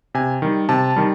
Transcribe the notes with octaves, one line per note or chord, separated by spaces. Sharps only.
C3 G#5
D#3 G3
C3 A5
D#3 G3